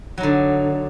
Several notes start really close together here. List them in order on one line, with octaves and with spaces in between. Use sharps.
F#3 D#4 D3